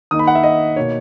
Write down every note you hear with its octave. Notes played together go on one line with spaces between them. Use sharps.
D#3 A#3 D#4 D#6
B5
F#5
E5
D#5
B2 A#3 D#4 C#5